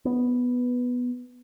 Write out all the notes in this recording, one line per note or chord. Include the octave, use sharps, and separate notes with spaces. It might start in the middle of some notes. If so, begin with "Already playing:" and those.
B3